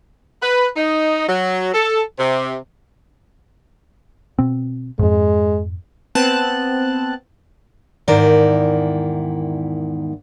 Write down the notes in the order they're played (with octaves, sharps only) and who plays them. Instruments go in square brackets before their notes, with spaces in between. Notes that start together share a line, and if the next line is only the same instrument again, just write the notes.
[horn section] B4
D#4
F#3
A4
C3
[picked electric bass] B2 C4
[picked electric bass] F2 G#2 [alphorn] G#3
[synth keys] B3 C4 A5 F#6
[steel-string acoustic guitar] E2 G#2 D#3 E4 A#4 D5